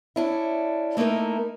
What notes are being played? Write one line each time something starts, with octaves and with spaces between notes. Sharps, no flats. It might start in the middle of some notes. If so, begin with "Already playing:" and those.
C#4 D4 E4
A3 A#3 D#4 E4 A#4